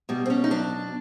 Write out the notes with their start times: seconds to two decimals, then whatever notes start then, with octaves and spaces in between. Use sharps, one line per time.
0.09 B2 G3
0.26 C4
0.30 C#4
0.44 D#4
0.50 F#3 D4